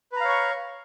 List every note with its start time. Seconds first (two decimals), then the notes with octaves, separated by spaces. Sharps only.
0.12 B4
0.16 A#5
0.20 F5
0.25 C#5
0.29 C#6